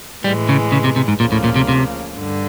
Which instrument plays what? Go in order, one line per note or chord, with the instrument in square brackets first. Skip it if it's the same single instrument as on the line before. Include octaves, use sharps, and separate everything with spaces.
[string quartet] A2 E3 G#3 [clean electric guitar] G3
[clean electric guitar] C#3
C#3
C3
C3
G#2
[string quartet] D2 C#3 F3 A#3 [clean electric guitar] A#2
[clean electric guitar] A2
A#2
C3
C3
[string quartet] G2 D3